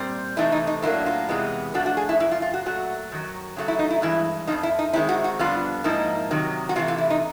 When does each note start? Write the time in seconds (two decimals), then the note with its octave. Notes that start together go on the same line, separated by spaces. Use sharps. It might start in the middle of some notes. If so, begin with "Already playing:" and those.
Already playing: A#2 G3 C4
0.37 C3 E3 A3 C4 D#4 E4
0.52 D#4
0.67 D#4
0.82 A2 F#3 A#3 D4 E4
1.06 F4
1.29 E2 C3 E3 G#3 B3
1.74 A2 F3 A3 D4 F#4
1.86 F#4
1.97 G#4
2.09 E4
2.20 F#2 C#3 E4
2.31 F4
2.42 F4
2.54 F#4
2.66 A#2 F#3 A3 F#4
3.12 F#2 D#3 F#3
3.56 C#3 F#3 A3
3.68 E4
3.79 D#4
3.90 E4
4.02 G2 E3 G#3 E4
4.47 F2 C3 F3 D#4
4.63 E4
4.79 D#4
4.93 D#3 G#3 C4 E4
5.09 F#4
5.24 F#4
5.39 F2 D3 G3 B3 D4 F4
5.84 G#2 F3 A#3 D#4 E4
6.31 C3 D#3 F#3
6.69 F#4
6.76 C3 E3 A3 F4
6.88 F4
6.98 E4
7.10 D#4